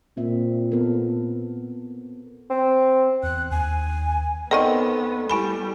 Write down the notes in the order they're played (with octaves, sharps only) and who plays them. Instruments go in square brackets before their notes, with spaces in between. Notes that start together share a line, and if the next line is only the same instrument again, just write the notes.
[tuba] A#2 [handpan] C4 E5
[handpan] B3 A4 A#4
[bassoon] C4
[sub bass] E2 [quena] F#6
[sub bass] D#2 [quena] G#5
[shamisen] D#3 C4 [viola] B3 [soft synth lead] A4 [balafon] D5 F#5
[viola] G3 [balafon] E4 G#5 B5